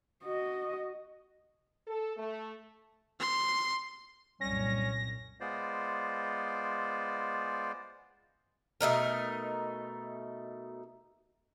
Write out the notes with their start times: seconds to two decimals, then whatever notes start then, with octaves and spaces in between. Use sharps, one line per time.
0.23 F#4 D#5
1.87 A4
2.17 A3
3.20 C6
4.41 C2 F#2 A#2 G3 C#4 A#6
5.40 G#3 B3 F4 C5 D5
8.81 B2 A3 D#4 A#4